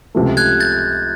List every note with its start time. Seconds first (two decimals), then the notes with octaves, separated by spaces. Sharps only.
0.15 C#2 C3 F3 A3
0.37 F#6 G#6
0.60 G6 A6